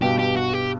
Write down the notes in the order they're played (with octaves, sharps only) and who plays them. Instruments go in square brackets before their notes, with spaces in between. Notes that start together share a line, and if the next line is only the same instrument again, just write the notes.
[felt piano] G2 B2 [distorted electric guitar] G4
[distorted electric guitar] G4
F#4
G4